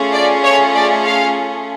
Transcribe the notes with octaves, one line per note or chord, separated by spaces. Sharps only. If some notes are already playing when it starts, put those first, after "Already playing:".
Already playing: A3 C#4 F4 G#4
D5
C#5
D5
F5